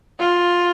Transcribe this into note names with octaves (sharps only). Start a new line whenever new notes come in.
F4